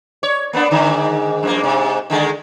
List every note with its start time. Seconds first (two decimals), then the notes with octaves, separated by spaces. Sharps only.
0.23 C#5
0.53 A#3 B3 D4
0.71 G#2 D3 D#3
1.43 F#2 F3 A#3
1.61 G#2 C3
2.10 D3 D#3 G#3